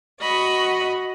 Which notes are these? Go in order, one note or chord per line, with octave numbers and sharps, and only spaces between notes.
F#4 D#5 B5 C#6